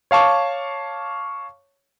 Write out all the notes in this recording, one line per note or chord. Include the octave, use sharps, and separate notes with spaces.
C#5 F5 A5 C#6 D6